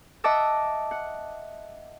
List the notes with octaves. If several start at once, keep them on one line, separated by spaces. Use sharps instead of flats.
D#5 E5 F#5 A5 D6 E6
F#5